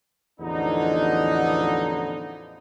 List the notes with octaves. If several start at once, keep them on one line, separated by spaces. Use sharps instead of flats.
A1 E2 D3 F3 B3 D#4